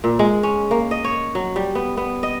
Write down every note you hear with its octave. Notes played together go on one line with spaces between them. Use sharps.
A#2
G#3
C#4
A#3
D#5
C#5
F#3
G3
B3
B3
D#5